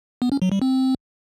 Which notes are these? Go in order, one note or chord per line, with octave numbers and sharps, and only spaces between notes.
B3
C#4
F#3
G3
C4